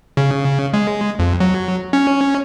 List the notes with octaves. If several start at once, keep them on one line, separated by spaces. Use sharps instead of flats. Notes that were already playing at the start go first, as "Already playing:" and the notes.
C#3
G#3
F2
F#3
C#4